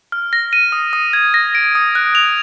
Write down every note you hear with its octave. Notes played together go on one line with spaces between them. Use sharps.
F6
A#6
D#7
D#6
D#6
G#6
A#6
D7
D#6
F#6
F7